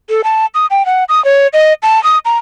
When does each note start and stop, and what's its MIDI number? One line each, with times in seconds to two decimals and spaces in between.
0.10 0.22 69
0.24 0.46 81
0.55 0.66 87
0.71 0.85 79
0.86 1.04 78
1.09 1.23 87
1.25 1.47 73
1.53 1.73 75
1.83 2.02 81
2.04 2.18 87
2.25 2.38 82